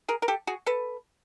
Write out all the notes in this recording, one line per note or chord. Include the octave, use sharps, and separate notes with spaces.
G#4 A#4
A#4
G4 A4
F#4 G#4
A4 B4